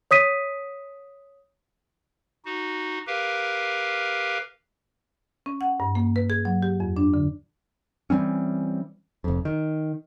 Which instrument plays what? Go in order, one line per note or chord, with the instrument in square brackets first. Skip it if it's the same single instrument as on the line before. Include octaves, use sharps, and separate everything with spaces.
[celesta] C#5 D#6 B6 D#7
[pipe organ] D#4 F#4
G4 A#4 B4 F5
[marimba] C#4
F#5
G2
A#3
B4
G#4
F#3
G4
F2
D4
D3
[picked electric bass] E3 G3 C4 C#4
F1 F2
D#3